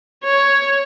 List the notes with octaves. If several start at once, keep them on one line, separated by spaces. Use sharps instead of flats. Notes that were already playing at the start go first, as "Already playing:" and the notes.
C#5